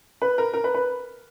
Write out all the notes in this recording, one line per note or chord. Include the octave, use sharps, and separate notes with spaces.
B4
A#4
A#4
B4
B4